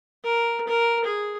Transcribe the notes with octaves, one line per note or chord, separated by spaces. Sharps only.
A#4
A#4
G#4